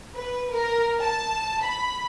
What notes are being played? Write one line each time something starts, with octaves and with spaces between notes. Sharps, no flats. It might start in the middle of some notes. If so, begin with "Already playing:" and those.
B4
A#4
A5
B5